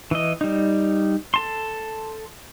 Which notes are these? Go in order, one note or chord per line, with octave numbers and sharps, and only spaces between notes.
E3 D#5
G3 D#4
A4 A5 C6